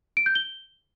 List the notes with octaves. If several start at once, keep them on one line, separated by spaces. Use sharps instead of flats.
D7
G6
G7